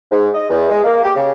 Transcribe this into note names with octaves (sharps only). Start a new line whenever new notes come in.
G#2
D#5
E2
G#3
A#3
G4
C#3